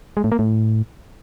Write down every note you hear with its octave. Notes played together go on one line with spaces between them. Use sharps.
G#3
A2
A#3
A2